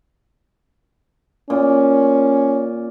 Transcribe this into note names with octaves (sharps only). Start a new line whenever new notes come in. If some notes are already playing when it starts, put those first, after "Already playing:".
A#2 C#4